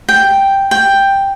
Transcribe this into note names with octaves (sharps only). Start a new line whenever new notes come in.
G5
G5